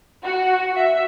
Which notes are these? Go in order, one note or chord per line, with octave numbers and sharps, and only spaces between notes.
F#4
E5